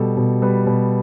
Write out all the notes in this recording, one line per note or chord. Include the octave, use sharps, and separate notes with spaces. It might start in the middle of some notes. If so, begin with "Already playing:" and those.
Already playing: B2 G3 A4
B2
G3 B4
B2